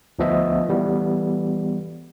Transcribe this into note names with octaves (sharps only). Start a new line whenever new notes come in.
D2 F3 B3 D#5 E5
E3 G3 B3